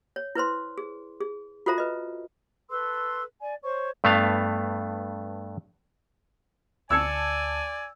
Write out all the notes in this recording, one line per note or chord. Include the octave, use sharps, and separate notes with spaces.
C#5
E4 B4 C5 C6
G#4
G#4
F4 F#4 A4 C5 E5 A#5
B4 D#5
A4 B4 C6 E6
D5 G#5
C5 C#5 C#6
G2 A3 B3 F5
D2 D5 G#5 A5 E6 G#6 C#7